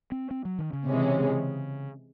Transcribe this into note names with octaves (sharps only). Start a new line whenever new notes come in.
C4
C4
F#3
D#3
C#3
C3 E3 G#3 C#4